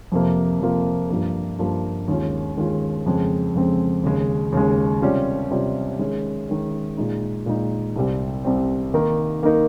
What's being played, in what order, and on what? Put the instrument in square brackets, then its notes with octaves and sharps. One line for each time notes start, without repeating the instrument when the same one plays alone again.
[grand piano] F2 C3 F3 A#3
F2 C3 F3 A#3
G2 F3 A#3
G2 F3 A#3
D#2 D#3 G#3 C#4 F4
D#2 D#3 G#3 C#4 F4
F2 C#3 G#3 C4
F2 C#3 G#3 C4
D#2 C#3 G#3
D#2 C#3 G#3
C3 G3 C#4 F4
C3 G3 C#4 F4
D#3 G#3 C#4
D#3 G#3 C#4
A#2 G#3 D#4
A#2 G#3 D#4
C2 C3 G3 C4
C2 C3 G3 C4
D#3 A#3 D#4 A#4
D#3 A#3 D#4 A#4